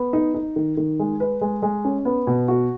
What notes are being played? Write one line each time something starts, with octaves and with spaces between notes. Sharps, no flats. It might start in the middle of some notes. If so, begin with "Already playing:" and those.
Already playing: B3
D#4
D#4
D#3
D#3
G#3
B4
G#3
G#3
C#4
B3
B2
F#4